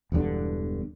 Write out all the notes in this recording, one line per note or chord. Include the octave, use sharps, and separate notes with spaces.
E1 E2 G2 D3